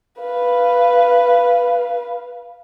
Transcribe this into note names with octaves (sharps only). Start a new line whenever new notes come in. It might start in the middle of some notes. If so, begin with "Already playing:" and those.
B4 F5